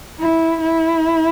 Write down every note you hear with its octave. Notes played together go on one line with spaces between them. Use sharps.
E4
E4